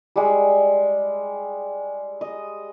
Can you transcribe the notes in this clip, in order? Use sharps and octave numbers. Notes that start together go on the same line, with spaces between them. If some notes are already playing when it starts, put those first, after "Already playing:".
G3 G#3
D#5